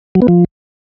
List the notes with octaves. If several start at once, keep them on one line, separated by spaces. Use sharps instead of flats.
F#3
B3
F3